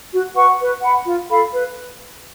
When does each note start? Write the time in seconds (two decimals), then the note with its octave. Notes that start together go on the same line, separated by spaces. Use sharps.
0.12 F#4
0.34 B4 F#5 C#6
0.58 B4
0.81 F#5 B5
1.05 F4
1.29 A4 F5 B5
1.52 B4